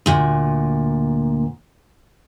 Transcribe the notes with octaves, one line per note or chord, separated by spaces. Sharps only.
D2 A#2